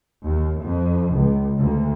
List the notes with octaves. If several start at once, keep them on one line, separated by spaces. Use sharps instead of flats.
D#2
F2
C#2
D2